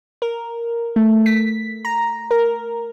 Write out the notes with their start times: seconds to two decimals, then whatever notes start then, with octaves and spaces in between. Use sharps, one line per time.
0.22 A#4
0.96 A3
1.26 B6
1.85 A#5
2.31 A#4